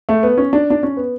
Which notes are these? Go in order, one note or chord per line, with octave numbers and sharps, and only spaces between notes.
A3
B3
C#4
D4
D4
C#4
B3